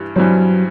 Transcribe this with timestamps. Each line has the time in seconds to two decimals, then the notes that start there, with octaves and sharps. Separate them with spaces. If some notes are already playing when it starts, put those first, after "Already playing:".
Already playing: G2 E3 G3
0.16 G2 E3 F#3 G3 C4